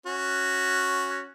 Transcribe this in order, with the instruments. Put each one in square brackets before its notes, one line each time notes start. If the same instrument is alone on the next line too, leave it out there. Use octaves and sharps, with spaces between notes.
[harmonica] C#4 F#4